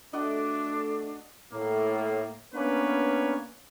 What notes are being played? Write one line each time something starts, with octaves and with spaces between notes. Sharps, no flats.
A3 D4 F#4 D5 D#5
A2 A#3
A#3 B3 C#4 D4 B4 C#5